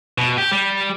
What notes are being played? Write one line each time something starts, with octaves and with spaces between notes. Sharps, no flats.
B2
G4
G3